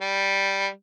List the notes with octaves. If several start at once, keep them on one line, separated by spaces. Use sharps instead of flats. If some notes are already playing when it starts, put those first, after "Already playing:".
G3